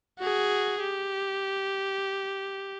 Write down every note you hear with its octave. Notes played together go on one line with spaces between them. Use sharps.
F#4 G#4
G4